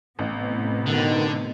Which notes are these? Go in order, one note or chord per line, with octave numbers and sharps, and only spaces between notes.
A1 A2 C3 B3
B2 D3 D#3